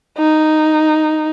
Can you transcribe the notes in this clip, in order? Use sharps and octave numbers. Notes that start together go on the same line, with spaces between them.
D#4